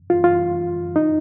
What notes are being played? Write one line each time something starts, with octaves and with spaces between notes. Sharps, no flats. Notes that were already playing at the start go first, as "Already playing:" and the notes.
F4
F4
D#4